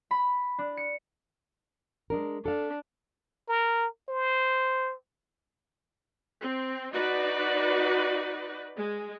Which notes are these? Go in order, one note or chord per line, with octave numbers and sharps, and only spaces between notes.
B5
D4
C#7
G#3 D4 A#4
D4 A4 F5
A#4
C5
C4
D#4 F#4 B4 D5
G#3